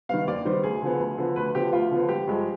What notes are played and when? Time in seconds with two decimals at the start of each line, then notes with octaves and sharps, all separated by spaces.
0.09 D#3 G3 B3 F5
0.27 D#2 D5
0.45 D#3 G3 B3 C5
0.64 D2 G#4
0.82 D3 F3 B3
1.00 D2
1.18 D3 F3 B3
1.36 D2 B4
1.55 D3 F3 B3 G4
1.73 D2 F4
1.91 D3 F3 B3
2.09 G#1 G4
2.27 G2 F3 G#3